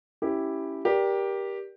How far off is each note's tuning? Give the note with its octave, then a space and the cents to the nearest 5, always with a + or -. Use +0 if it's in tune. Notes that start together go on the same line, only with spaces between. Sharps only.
C#4 +0 E4 +0 G4 +0
G4 +0 A#4 +25 D5 +5